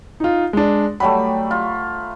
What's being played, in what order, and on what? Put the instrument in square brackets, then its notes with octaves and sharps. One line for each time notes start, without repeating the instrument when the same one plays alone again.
[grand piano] D#4 F4
G#3 D4
[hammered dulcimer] F#3 G3 A3 [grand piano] B5
[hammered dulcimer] F4